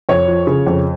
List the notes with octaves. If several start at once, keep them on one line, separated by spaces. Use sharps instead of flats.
F2 C#5
F3
C#3
F2